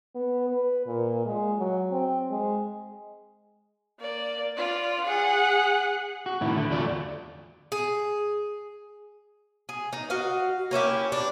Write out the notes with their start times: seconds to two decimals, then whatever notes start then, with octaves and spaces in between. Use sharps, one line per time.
0.15 B3
0.49 B4
0.86 A#2
1.26 G#3
1.59 F#3
1.92 C4
2.31 G#3
3.99 A#3 D5
4.57 F4 D5
5.04 G#4 F#5
6.26 F#4
6.41 A2 D#3 E4
6.57 D3 A3
6.70 E2 A3 F4 F#4 D5
7.72 G#4
9.69 G#4
9.93 D#4
10.10 F#4 D#5 F5
10.71 A#3 C#4 E4 G4
11.12 D4